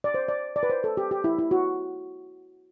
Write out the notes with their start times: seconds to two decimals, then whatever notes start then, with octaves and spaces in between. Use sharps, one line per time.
0.04 D5
0.14 C5
0.28 D5
0.56 D5
0.63 B4
0.70 C5
0.84 A4
0.97 G4
1.11 G4
1.24 E4
1.39 E4
1.51 F#4